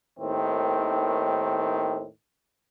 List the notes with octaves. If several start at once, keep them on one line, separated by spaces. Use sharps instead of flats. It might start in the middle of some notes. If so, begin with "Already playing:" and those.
D#2 A2 D#3 C4